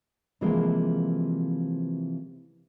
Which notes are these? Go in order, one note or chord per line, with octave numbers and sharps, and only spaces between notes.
C3 E3 F3 G#3 A#3